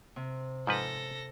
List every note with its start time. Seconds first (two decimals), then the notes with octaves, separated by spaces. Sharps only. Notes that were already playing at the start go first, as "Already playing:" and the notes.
0.16 C3
0.67 G#2 F3 A4 B4 A#6